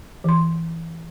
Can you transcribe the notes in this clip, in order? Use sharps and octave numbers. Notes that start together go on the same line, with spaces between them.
E3 C6